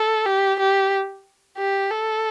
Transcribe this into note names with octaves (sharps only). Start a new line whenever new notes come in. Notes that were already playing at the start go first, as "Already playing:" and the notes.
Already playing: A4
G4
G4
G4
A4